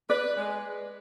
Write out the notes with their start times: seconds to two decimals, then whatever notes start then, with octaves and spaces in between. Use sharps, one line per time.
0.09 B4 D5
0.37 G#3